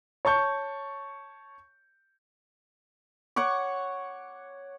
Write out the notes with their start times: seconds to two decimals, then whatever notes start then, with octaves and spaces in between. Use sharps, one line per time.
0.25 C#5 A5 C#6 G6
3.36 C#5 F#5 C#6 D6